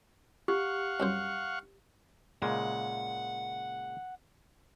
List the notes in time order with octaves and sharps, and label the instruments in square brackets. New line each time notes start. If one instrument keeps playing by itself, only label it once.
[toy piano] G4 [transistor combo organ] F5 F#5 C#6
[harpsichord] C2 F#2 C5
[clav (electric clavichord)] A#2 C#3 G#3 [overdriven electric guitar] F#5